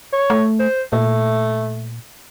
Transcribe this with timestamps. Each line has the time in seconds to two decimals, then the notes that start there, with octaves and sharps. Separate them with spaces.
0.13 C#5
0.30 A3
0.59 C5
0.93 A#2 A3